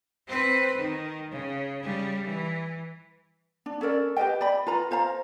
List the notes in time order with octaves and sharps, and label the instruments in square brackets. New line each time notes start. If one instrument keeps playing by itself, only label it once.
[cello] C4 B4
D#3
C#3
C#3 G3
E3
[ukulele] D4
C#4 A4 A#4 D5
G4 B4 D#5 G5
D5 B5
F4 B4 A#5 B5
F4 C5 F5 A#5